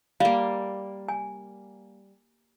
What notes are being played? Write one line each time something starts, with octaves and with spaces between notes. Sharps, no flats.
G3 A#3 F5
G#5